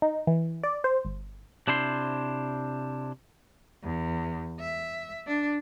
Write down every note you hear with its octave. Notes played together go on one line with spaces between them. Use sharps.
D#4
E3
D5
C5
G1
C3 D4 E4 C5 C6
E2
E5
D4